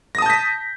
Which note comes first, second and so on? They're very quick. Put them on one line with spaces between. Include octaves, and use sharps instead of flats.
A#6 D#6 A5 G6 B6